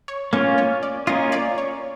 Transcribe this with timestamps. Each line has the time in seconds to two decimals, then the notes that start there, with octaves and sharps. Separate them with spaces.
0.08 C#5
0.33 A#3 C#4 F4 C#5
0.58 C#5
0.83 D5
1.07 A#3 C#4 F4 D#5
1.32 D5
1.58 C#5